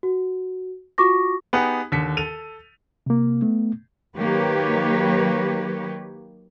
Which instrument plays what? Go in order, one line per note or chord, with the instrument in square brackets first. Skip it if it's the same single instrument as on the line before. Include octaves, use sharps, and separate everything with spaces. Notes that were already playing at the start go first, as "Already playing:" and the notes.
[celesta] F#4
F4 F#4 C#6 D6 A#6
[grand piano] B3 D#4 G4 G#4 B4 F#5
D#2 D3 B6 C#7
A4 D#7 F7
[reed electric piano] C3 A#3
A3 B3
[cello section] D#3 F#3 A#3 G4 B4 C#5